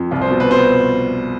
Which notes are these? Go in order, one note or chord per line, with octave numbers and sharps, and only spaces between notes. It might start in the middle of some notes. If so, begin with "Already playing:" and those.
Already playing: F2
C2 F4
C5
B2
B4
B2 C5